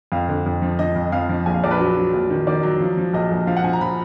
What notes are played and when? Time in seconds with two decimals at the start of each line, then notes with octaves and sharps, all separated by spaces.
0.12 F2 F5
0.29 D3
0.46 F2
0.62 F3
0.79 F3 D#5
0.96 F2
1.12 F2 F5
1.29 F3
1.46 A#1 G#5
1.54 F5
1.64 A#1 D5
1.71 B4
1.80 F#3
1.97 F#3
2.13 A#1
2.30 D#3
2.47 D#3 D5
2.63 F#3
2.81 F3
2.97 F3
3.13 A#1 D#5
3.31 A#1
3.47 F3 F5
3.57 F#5
3.64 F3 G#5
3.73 A#5
3.81 F3 B5